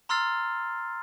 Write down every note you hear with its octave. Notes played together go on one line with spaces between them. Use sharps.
A#5 C6 E6 F6 A6 C7